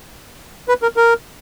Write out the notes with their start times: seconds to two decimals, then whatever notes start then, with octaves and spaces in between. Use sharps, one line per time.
0.69 B4
0.82 A#4
0.97 A#4